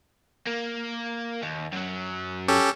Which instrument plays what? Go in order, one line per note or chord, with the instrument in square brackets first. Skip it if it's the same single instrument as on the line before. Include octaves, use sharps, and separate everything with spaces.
[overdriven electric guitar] A#3
D#2
F#2 F#3
[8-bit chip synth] C#4 G4 A4